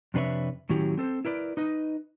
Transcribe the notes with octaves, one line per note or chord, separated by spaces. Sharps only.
F2 C3 D4 B4 C#5 E5
A2 D#3 F#3 C#4 E4 G4
C4 A4 C5
E4 A#4 B4 D5
D#4 B4 D#5